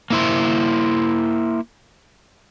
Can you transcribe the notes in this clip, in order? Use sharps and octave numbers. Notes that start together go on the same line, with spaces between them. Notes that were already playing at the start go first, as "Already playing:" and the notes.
A#3 E4 C5